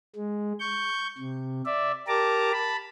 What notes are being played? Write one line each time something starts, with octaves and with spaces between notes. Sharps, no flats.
G#3
C#6 G6
C3
D5 E5
G4 A#4 A5 A#5 D6
A5 B5